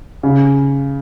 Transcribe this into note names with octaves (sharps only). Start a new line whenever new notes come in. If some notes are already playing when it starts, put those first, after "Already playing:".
C#3